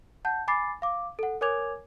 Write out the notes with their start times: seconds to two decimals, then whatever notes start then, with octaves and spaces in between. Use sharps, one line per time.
0.25 F#5 A5 G6
0.48 G#5 B5 D6 A6 C7
0.82 F5 D6
1.19 A4 F#5
1.41 A#4 C#5 G#5 D6 G#6 F7